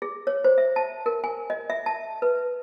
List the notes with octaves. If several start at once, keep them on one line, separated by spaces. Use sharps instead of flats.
G#4
C#5
C5
E5
A5
A#4
G#5
D#5
E5
A5
B4